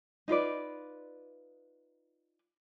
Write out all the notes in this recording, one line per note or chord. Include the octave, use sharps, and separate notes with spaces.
D#4 F4 B4 D5